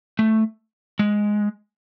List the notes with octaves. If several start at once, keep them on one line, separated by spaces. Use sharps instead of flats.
A3
G#3